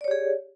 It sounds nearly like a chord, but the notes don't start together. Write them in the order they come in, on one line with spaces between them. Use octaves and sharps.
D5 C#5 G4 G#4